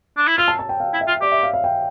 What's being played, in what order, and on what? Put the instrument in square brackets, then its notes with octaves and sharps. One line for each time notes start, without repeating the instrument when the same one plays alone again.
[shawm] D4
E4
[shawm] F4 [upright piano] E6
[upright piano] A5
A5
G5
F5
[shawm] E4
[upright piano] E5
[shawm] F4
[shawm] G4 [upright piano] D5
[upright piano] E5
F5
F5
G5